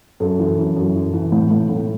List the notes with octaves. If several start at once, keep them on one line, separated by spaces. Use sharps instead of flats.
F#2 A4
E3
F#2
F#2
E3
E3
A2
A2
A2